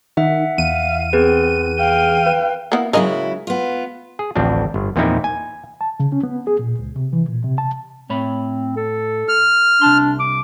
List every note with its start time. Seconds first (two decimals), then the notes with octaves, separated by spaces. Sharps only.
0.17 D#3 E5 F#5
0.58 E2 F5 D#7
1.13 B3 C4 G#4 B4
1.79 F5 G5
2.26 B4
2.72 A#3 B3 E4
2.93 C#3 F#3 G#3 E4 A#4 D#5
3.47 B3 F4
4.19 G#4
4.36 A1 D2 F3 C4 D4
4.74 G1
4.96 E2 A#2 F3 C4 D#4 E4
5.24 G#5
5.81 A5
6.00 C#3
6.12 C#4
6.23 B3
6.47 G#4
6.59 A#2
6.79 C#2
6.96 C3
7.13 E3
7.29 A#2
7.44 C3
7.58 A5
8.10 A2 C4 C#5 B5
8.76 A4
9.28 F6
9.81 C2 D4 A5 C6
10.19 D6